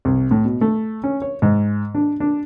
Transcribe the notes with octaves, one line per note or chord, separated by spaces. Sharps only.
C2
A2
B2
A3
C#4
C#5
G#2
D4
D4